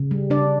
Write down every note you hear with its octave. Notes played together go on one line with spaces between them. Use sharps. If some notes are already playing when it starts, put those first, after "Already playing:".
Already playing: C#3
G3
C#3 D4 D5